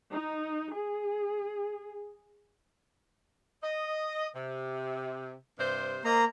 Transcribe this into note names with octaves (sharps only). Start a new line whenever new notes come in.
D#4
G#4
D#5
C3
G2 C3 C5
A#3 C5 D#5 A#5